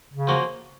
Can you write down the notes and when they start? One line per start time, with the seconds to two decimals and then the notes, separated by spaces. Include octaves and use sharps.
0.13 C#3
0.27 F3 A#3 C#4 F#4